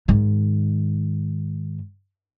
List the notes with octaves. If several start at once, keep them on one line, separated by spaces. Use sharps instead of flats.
G#2 D#3